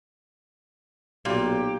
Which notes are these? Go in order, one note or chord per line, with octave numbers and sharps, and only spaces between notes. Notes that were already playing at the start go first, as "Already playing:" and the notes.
B1 A#2 G4